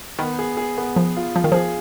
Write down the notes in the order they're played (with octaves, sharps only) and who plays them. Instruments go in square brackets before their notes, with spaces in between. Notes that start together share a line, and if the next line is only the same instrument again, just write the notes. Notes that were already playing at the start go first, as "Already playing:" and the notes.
[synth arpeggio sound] D#3 [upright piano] B3
[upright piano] G#4
G#4
B3
[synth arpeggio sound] F3 [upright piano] B3
[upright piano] F4
[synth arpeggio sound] F3 [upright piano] F4
[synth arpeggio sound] D#3
[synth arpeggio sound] F3 [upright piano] G#4